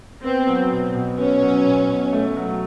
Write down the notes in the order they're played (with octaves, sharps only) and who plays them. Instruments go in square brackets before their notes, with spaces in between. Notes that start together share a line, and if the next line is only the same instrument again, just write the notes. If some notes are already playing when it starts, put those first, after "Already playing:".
[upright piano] B3 [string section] C4
[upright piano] F#3
B2
B2
[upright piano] B3 [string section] C#4
[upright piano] F#3
B2
B2
A3
F#3